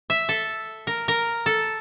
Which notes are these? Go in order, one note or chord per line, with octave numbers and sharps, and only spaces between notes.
E5
A4
A#4
A#4
A4